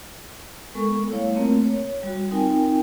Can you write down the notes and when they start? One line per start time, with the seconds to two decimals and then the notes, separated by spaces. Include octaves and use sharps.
0.75 G#3 B3 A4 A#4 C#6
1.10 G3 A3 E4 C#5 F5
1.35 A3 A#3 C4 F4 A#4
1.65 C#5
2.03 G3 F#4
2.31 C4 D#4 F4 A#4 G5 G#5